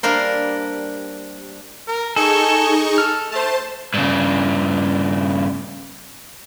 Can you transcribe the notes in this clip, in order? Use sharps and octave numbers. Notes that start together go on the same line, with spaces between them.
G3 A#3 D4 A#4 C5
A#4
D#4 G#4 A4 G#5 C#6
A4 F6
A3 C5 A5
G2 C#3